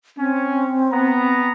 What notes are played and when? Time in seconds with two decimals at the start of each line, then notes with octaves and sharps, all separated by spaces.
0.17 C4 C#4
0.92 B3 A#5